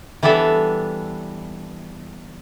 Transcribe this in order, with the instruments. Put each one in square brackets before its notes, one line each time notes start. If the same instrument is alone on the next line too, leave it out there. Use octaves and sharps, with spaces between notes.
[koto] E3 G3 B3 D4 A4 E5